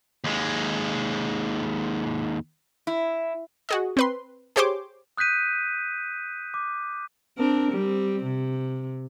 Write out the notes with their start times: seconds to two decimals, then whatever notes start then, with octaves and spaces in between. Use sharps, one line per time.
0.24 D#2 G#3
2.87 E4
3.69 F#4 G#4 D#5
3.97 C4 B4 C6
4.56 G4 G#4 C5 C#5 C6 D6
5.17 D#6 F#6 G6 B6 D#7
6.54 D6
7.38 C4 D4 A#4
7.72 G3 C4
8.23 C3